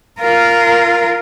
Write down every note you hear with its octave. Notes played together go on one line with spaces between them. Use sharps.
F4 A#4